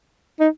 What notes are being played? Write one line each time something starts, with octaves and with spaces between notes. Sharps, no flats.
D#4